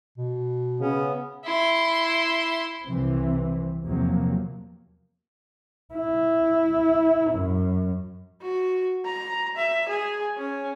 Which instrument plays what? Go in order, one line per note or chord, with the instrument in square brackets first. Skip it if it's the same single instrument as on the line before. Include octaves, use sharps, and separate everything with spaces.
[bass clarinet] B2
[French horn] C#3 [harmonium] B3 [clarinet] C#4
[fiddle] E4 C6
[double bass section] C2 C3 E3 C4
E2 C3 F3 F#3 A#3
[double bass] E4
F#2
[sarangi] F#4
A#5
E5
G#4
C#4